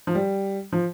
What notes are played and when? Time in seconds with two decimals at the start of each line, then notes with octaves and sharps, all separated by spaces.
0.07 F3
0.15 G3
0.73 F3